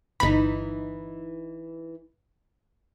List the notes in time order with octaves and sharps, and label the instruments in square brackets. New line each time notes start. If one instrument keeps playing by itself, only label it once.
[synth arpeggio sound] G1 B5 [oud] E3 D#4